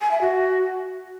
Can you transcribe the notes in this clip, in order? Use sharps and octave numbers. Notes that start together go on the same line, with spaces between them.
G#5
E5
F#4